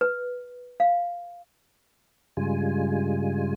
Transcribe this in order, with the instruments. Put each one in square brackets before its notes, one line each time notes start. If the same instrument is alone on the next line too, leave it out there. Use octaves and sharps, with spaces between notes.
[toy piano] B4
F5
[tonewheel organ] G2 C#3 G3 G#3 F4 G#5